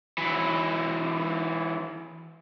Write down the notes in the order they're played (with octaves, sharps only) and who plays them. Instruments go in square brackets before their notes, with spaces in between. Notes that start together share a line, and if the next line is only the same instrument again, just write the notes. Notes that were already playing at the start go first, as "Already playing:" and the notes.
[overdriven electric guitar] E3 F#3